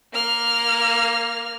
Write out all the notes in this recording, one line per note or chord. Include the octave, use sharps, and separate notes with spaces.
A#3 F6